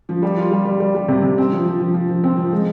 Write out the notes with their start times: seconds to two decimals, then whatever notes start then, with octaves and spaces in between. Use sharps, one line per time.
0.09 F3
0.22 G3
0.37 F4
0.51 G3
0.65 G3
0.80 G3
0.95 G3
1.08 C3
1.22 C3
1.38 C4
1.52 F3
1.65 F3
1.80 F3
1.94 F3
2.09 F3
2.24 C4
2.37 F3
2.52 G#3